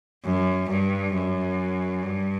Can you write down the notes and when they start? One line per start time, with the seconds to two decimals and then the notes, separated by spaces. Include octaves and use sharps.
0.25 F#2
0.70 G2
1.14 F#2
2.03 G2